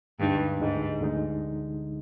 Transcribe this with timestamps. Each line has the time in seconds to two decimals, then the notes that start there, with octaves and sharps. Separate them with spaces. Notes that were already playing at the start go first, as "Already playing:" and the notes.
0.19 D2 G2 D3 G#3 D#4
0.60 D2 G#2 D3 G#3 D#4
1.02 D2 D3 G#3 D#4